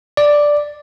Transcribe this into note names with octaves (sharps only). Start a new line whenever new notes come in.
D5